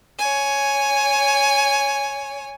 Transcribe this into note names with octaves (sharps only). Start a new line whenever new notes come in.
C#5 G#5